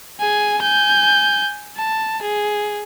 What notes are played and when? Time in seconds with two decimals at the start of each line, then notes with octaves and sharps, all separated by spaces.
0.20 G#4 G#5
0.62 G#5 G6
1.77 A5
2.22 G#4